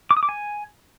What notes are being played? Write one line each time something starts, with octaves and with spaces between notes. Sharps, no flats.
D6
D#6
D6
G#5